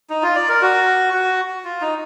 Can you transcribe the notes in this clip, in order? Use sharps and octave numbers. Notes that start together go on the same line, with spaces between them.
D#4
F4
D5
A#4
F#4
F#4
F4
D#4